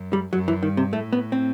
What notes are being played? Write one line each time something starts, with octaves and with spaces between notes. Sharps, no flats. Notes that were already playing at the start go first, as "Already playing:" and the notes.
Already playing: F#2
G3
F#2 F#3
E3
G2 D#3
C3
A2 A3
B3
C4